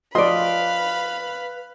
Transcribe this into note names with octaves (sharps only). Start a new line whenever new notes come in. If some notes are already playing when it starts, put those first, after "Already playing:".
F3 B4 D5 D#5 F5 B5 C6